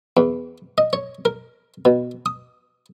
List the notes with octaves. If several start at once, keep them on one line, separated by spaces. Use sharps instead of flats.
E2
D#5
C#5
A#4
B2
D#6